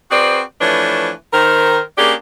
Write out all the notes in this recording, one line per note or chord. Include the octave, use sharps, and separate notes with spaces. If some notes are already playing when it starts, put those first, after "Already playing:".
C4 F#4 G#4 B4 C5 D5
E3 F3 A3 D4 B4 C#5
D#3 A#4 C5
A#3 C#4 D4 G4 G#4